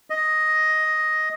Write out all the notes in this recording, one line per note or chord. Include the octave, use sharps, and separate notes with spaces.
D#5